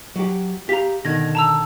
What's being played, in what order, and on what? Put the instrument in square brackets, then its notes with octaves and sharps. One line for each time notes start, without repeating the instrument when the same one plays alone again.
[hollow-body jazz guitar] F#3 G4
[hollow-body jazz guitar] G4 F5 [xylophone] A#5 B6
[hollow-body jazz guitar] B2 D3 D#3 [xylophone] G#6 A#6
[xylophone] A5 A#5 E6